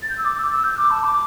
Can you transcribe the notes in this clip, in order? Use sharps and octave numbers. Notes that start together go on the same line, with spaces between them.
A6
G6
E6
D6
E6
E6
G6
D6
A5
D6